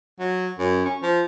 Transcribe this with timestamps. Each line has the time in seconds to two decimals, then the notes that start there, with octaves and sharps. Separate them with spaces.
0.20 F#3
0.59 F#2
0.85 C#4
1.03 F3